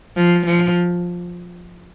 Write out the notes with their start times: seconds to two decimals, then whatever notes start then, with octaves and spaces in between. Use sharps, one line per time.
0.16 F3
0.45 F3